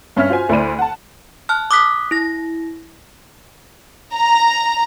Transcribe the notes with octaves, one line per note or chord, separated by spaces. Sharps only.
G2 C#4 E5 F6 B6
F4 F#4 C5 G#5
D2 E4 C5 D5 B5 D#7
F#5 A5
A5 F6 F#6
D6 D#6 F#6 B6
E4 A#6
A#5